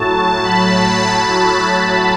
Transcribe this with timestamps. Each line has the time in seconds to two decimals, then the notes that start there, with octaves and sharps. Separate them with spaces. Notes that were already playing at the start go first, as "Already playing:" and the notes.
Already playing: A2 F#3 A5
0.44 B5